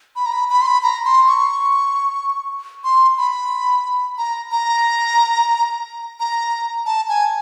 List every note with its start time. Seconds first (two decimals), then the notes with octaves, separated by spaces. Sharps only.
0.16 B5
0.26 A#5
0.33 B5
0.50 B5
0.62 C6
0.67 B5
0.83 A#5
1.05 C6
1.28 C#6
2.84 C6
3.18 B5
4.18 A#5
4.52 A#5
6.20 A#5
6.86 A5
7.09 G#5